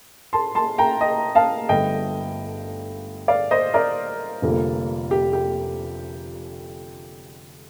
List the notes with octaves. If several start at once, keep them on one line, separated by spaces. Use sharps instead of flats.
A5 C6
A5 C6
G5 A#5
D#5 G5
F5 A5
G1 G2 D3 A3 D#5 G5
D5 F5
C5 D#5
A#4 D5
F1 F2 D3 G3 A#3
G4
G4